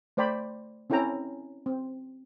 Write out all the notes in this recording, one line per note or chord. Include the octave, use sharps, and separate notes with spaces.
A3 C5 D5 G5 B5
C4 C#4 E4 A4 G5 A#5
C4